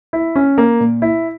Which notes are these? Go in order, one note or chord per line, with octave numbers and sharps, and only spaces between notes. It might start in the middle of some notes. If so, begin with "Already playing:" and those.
E4
C#4
A#3
A#2
E4